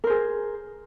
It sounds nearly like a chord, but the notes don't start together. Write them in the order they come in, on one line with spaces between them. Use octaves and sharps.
A#4 C5 G#4